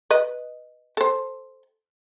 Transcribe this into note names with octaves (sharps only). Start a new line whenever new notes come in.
B4 D#5
A4 C5